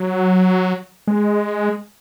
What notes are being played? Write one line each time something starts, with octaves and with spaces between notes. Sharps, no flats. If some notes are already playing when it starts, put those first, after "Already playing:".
Already playing: F#3
G#3